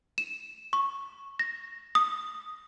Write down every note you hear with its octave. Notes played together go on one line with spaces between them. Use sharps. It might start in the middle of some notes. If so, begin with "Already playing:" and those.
E7
C#6
A#6
D#6